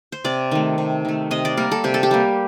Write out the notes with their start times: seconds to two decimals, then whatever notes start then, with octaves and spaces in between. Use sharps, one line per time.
0.12 C5
0.24 C3 D5
0.51 D#3 A3
0.78 C3
1.05 D#3 A3
1.31 C3 D#5
1.45 D5
1.57 G3 A#3 A#4
1.72 A4
1.84 C3 G4
1.94 A4
2.03 G4
2.11 G3 A#3